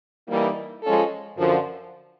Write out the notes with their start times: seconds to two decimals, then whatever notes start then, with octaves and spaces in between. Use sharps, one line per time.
0.29 E3 G3 A#3 D#4
0.83 F3 G#3 C#4 F4 A4
1.38 F#2 D3 F3